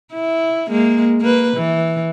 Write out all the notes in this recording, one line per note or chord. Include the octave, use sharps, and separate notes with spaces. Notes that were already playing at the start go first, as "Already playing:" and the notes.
E4
G#3 A#3
A#3 B4
E3